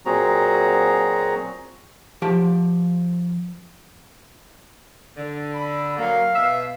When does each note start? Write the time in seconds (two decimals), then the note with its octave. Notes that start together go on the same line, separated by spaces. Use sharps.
0.06 A#2 F#3 C4 F#4 G#4 A#5
2.22 F3 G4 A5
5.17 D3
5.53 B5
5.98 F#3 A#3 F5
6.35 B2 E5